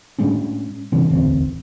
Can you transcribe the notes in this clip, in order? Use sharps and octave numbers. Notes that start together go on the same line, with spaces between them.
A2 G#3 C#4 D4
C3 E3 C#4
E1 A1 D2 C4